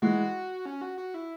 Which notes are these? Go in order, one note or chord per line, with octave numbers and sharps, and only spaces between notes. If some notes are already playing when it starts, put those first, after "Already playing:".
E3 G#3 F#4
C#4
F#4
F#4
E4